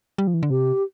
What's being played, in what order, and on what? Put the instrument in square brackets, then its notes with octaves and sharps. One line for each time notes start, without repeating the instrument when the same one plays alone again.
[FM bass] G3
F3
E3
D3
[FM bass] C3 [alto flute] G4